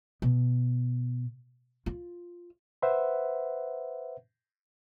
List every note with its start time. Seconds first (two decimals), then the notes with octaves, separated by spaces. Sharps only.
0.22 B2
1.86 F4
2.82 B4 C5 E5 F#5